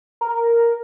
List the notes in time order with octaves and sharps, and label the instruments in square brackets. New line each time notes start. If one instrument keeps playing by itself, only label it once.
[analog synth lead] A#4